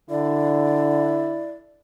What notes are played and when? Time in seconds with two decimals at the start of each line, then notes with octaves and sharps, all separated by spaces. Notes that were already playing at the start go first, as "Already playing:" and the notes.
0.10 D3 E4 D5